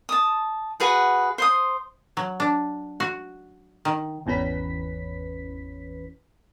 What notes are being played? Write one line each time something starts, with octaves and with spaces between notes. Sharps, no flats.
A5 D#6
F#4 G#4 B4 F#5
C5 C6 D#6
F#3
D4
F#4
D#3
G#1 E2 E3 C#4 B4 B6